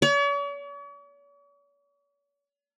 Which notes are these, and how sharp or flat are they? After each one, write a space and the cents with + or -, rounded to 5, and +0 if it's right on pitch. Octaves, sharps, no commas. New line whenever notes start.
C#5 +45